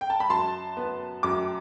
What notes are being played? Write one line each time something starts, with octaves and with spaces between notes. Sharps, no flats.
G5
A5
B5
F#2 A5 C6
B3
F#2 D6